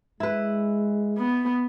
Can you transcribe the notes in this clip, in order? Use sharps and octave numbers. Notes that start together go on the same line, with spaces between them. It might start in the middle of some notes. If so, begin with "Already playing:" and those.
G#3 E4 B4
B3